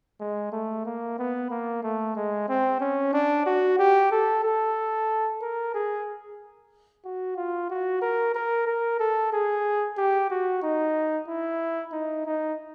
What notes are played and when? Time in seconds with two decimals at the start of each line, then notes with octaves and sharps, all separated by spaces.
0.20 G#3
0.52 A3
0.86 A#3
1.18 B3
1.51 A#3
1.83 A3
2.16 G#3
2.48 C4
2.80 C#4
3.13 D4
3.46 F#4
3.79 G4
4.11 A4
4.43 A4
5.41 A#4
5.74 G#4
7.05 F#4
7.36 F4
7.70 F#4
8.02 A#4
8.35 A#4
8.66 A#4
9.00 A4
9.33 G#4
9.97 G4
10.30 F#4
10.62 D#4
11.28 E4
11.92 D#4
12.26 D#4